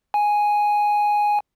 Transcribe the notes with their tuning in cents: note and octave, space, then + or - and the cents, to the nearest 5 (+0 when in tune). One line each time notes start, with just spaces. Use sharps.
G#5 +0